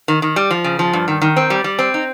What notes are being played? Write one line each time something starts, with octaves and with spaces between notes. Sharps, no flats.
D#3
D#3
G3
F3
C#3
F3
G2
D#3
D#3
C4
G3
G3
C4
D#4